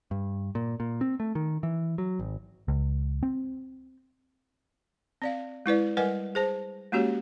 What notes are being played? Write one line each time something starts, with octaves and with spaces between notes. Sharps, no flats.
G2
A#2
A#2
C4
A3
D#3
E3
F#3
G#1
C#2
C4
C4 D5 F5
G#3 E4 B4 D5
G3 A#4 B4 D#5 F#5 G#5
G#4 C5 A5
G#3 A#3 C#4 F#4 G4 C#5